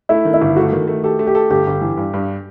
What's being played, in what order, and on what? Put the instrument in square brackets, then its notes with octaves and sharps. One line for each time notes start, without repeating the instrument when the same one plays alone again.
[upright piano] A3 [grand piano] E4
[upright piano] D#3
[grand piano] E4
[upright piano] G1
[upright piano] A3 [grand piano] F#4
[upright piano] D#3
A3
[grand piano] G4 [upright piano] A4
[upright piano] A3
[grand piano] G4
[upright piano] A4
[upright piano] G1 [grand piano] G4
[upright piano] G1
E3
G2
G2